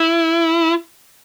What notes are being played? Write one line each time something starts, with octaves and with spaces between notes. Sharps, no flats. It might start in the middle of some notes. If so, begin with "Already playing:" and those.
Already playing: E4